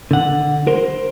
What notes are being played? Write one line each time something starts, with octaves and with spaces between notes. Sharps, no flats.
D3 F#5
A#4 C5